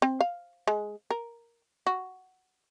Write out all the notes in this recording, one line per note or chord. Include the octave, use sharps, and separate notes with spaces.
C4
F5
G#3
A#4
F#4